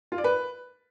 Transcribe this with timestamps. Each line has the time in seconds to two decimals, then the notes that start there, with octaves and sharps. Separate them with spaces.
0.12 F4
0.18 D5
0.24 B4